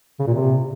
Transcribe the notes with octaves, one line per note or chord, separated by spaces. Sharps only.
C#3
A#2
C3